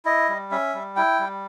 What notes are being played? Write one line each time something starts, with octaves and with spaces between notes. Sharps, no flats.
E4 D#5
G3
C#4 E5
G3
E4 G5
G3